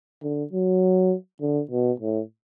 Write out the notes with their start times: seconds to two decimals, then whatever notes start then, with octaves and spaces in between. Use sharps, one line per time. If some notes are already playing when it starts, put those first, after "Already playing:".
0.23 D3
0.53 F#3
1.41 D3
1.71 B2
2.00 A2